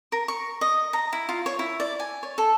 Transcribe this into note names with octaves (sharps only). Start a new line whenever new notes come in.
A#4
C#6
D#5
A#5
E4
F4
C#5
E4
D5
G#5
C#5
A4